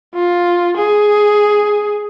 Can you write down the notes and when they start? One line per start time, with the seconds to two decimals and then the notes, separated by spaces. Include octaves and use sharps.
0.15 F4
0.77 G#4